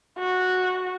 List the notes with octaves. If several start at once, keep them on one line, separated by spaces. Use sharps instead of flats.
F#4